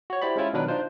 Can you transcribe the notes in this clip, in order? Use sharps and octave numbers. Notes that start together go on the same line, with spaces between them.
F#4 C#5
E4 G4 C5 D5 B5
G#3 C#4 E4 F4
B2 D#3 F#3 D4 A#4 B4
D4 D#4 F4 C5